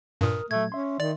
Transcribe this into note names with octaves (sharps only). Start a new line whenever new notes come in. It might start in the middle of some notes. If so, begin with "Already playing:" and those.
G2 A#2 A#4 D#6 F6
A#2 F#3 A3 G#6
C#4 E5 C6
D#3 D5